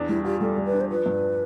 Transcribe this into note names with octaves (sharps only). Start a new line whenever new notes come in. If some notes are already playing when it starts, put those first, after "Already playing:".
Already playing: E2 D4
G3 E4
F4 G4
G3 A4
G3
B4
D4
C5
F3 B4
G2